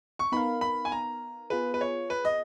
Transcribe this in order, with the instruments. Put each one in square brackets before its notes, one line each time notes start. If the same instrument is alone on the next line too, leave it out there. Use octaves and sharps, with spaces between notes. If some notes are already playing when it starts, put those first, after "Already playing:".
[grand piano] C#6
[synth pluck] B3 D#4 A#4 F5 [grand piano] B5
[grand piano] B5
G#5
A#5
[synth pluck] B3 F4 G#4 [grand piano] B4
[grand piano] B4
C#5
B4
D#5